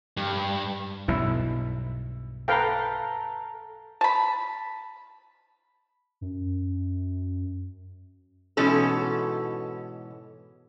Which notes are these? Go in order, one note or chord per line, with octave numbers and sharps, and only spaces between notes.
G2
B1 G2 B2 E4 E5
A4 B4 F5 G5 A#5
A5 B5
F#2
G#2 B2 E3 C#4 A4